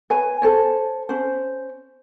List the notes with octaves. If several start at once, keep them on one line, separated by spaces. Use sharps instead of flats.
B4 C#5 G#5
A4 C5 C#5
C#4 C5